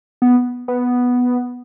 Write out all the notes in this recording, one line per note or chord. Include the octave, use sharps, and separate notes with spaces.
B3
B3